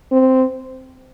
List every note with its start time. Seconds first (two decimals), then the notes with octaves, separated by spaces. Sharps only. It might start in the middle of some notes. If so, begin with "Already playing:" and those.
0.12 C4